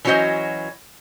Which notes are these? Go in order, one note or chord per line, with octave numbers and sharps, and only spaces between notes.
E3 F#3 C#4 F#4 C5 D#5